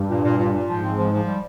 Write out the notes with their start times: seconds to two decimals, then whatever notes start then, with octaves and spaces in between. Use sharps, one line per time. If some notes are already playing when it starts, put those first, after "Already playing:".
Already playing: G2
0.09 A#2
0.23 A#2
0.38 A#2
0.53 A#2
0.68 G#2 F3
0.82 C4
0.97 F3
1.12 F3
1.26 G3